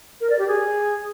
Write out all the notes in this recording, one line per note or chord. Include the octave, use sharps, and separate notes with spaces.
A#4
D5
G4
G#4